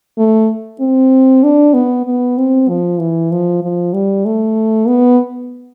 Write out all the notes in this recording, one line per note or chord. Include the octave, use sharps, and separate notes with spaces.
A3
C4
D4
B3
B3
C4
F3
E3
F3
F3
G3
A3
B3